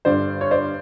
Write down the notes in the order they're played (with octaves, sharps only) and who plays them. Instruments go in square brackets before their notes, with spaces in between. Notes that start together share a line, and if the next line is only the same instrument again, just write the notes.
[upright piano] G2 D3 G3 C5 D5
C#5
C5 D5